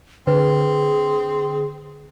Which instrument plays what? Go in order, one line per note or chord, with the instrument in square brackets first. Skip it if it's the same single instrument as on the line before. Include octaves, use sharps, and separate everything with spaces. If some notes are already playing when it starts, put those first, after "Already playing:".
[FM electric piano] D3 [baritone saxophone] C4 [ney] G#4 [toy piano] B4